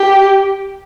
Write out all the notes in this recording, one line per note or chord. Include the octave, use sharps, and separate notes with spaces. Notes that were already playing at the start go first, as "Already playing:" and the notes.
Already playing: G4